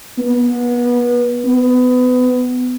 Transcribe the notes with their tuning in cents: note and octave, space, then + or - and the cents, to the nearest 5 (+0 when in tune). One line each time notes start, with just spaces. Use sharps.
B3 -30
B3 +25